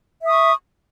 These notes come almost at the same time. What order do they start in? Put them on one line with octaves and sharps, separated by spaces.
E5 D#6 C#6